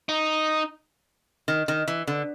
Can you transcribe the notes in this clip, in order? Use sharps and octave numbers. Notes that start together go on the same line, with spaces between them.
D#4
D#3
D#3
E3
D3